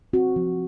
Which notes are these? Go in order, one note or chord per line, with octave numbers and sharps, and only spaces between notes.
C4 F#4
F3